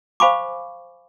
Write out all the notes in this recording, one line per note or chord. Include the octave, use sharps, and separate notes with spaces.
C5 F5 G#5 B5 C#6 D6